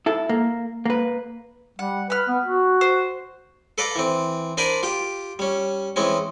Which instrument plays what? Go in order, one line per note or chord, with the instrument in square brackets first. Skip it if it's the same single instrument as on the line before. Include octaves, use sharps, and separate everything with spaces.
[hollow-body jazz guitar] E4 A4
A#3
A#3 B4
[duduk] G3 [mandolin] F#5
[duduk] B4 [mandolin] B5 F6
[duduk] B3
F#4
[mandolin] C5
[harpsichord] A4 B4 D5 F5 A#5
E3 C4
D4 A#4 C5 D5 G#5 B5
F4 G4 G5
G3 C#4
E3 G#3 C4 C#4